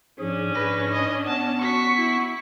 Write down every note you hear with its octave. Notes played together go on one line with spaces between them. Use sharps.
G#2 F3 C#4 D4 G#4
G#2 B4 A#6
D#5
B3 A5
F#4 C#6 B6
E4